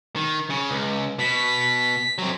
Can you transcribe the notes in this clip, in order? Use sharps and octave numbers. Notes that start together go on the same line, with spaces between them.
D#3
C#3
C#2
B2 B6
F#3 C4